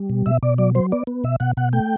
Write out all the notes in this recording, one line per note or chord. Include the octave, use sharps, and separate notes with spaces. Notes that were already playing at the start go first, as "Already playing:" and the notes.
Already playing: G3
B2
B2 E5
B2 D5
F#3 D5
F#3 C5
B3 D5
B3
B2 E5
B2 F#5
B2 F#5
A3 G5